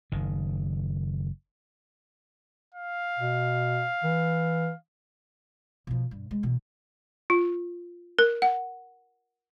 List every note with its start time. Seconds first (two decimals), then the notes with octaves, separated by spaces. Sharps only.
0.12 F#1 D#3
2.75 F5
3.19 B2
4.04 E3
5.87 B2 F3
6.11 G2
6.31 G#3
6.43 B2 E3
7.30 F4
8.19 A#4
8.42 F#5